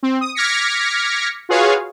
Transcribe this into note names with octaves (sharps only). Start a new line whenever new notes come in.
C4
D#6
D6 F6 G#6 A#6 B6 C#7
F4 F#4 G#4 B4 C#5 F5